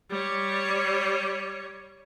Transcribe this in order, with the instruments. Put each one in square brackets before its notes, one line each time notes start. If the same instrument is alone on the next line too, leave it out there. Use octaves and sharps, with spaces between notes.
[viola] G3 C#5